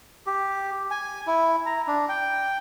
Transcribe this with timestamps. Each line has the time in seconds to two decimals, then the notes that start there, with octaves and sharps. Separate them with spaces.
0.26 G4
0.91 G#5
1.27 E4
1.66 A#5
1.88 D4
2.09 G5